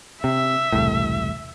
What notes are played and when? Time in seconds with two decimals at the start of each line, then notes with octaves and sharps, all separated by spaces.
0.24 C3 E5
0.72 E1 C2 A2